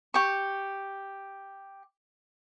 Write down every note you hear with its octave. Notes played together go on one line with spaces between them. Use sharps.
G4 C#6